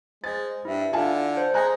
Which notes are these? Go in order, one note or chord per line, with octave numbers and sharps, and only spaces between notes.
G#3 C5 A6
G2 E4 E5
D3 F4 G#5 A5
C5
G#3 G#5 A#5 F#6